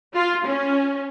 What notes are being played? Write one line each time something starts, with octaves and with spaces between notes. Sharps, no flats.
F4
C#4